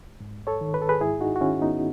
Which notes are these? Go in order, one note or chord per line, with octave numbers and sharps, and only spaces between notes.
G#2
A4 C#5
D#3
B4
A4
G#4 B4
G#2 E4 G#4
D#4 F#4
F#4
D#3 C#4 E4
B3 D#4